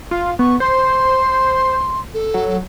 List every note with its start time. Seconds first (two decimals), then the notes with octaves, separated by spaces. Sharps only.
0.11 F4 F5
0.39 B3 C#6
0.60 C5 C6
2.14 A4
2.34 F#3